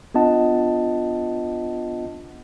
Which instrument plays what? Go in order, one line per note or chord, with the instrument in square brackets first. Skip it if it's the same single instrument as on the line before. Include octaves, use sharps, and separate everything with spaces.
[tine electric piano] B3 D4 F4 D#5 F#5 A5